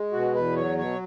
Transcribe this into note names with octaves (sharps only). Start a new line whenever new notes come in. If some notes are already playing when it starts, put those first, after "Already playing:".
Already playing: G#3
B2 F#4
E2 B4
F#3 C#5
B2 C#5